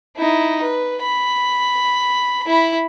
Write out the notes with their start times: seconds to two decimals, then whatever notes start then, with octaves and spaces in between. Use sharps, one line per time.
0.16 D#4 E4
0.62 B4
1.02 B5
2.46 E4 B5